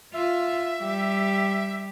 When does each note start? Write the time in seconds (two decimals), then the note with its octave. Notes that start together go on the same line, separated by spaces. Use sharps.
0.14 F4 E5
0.81 G3 G4